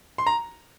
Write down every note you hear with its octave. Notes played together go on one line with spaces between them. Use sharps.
C6
A#5